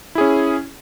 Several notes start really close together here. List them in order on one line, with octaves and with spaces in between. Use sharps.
E4 G#4 C#4